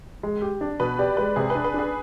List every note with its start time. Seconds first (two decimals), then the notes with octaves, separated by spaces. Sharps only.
0.23 G#3
0.42 G4
0.61 D4
0.80 B2 B4
0.98 G4 D5
1.17 G#3 B4
1.36 C3 G#4
1.50 B4
1.55 D4
1.64 B4
1.74 D4 G#4